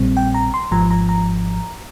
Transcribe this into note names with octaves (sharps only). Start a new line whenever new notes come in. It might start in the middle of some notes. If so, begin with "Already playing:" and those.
Already playing: A#1 A#2 G3 C4
G5
A#5
C6
G#1 G#2 F3 A#5
A#5
A#5